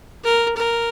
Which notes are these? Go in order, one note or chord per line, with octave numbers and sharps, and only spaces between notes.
A#4
A#4